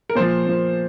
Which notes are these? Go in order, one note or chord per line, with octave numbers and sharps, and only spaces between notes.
A#4
A#2 F3 C5
A#2 F3